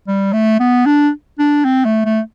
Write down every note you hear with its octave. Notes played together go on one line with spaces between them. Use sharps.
G3
A3
B3
D4
D4
C4
A3
A3